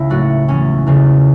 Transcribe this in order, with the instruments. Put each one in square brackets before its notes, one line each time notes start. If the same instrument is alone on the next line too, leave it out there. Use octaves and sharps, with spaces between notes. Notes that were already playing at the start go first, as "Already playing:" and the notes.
Already playing: [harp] C#2 C#3 E4
A2 F#3 A3 F#4
E2 E3 A3 C#4
E2 C#3 A3